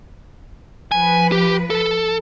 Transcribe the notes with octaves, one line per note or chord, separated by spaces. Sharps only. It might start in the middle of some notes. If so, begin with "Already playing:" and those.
F3 B4 G#5
G4
A4